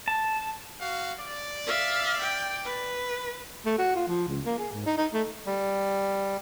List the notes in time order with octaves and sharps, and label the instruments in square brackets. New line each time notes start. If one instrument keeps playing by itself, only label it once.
[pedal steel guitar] A5
[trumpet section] F#4 F5
D5
[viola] E5 F5
G5
B4
[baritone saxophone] A3
F#4
F4
F3
C#2
A#3
G#4
G#2
D#4
D#4
A3
[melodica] G3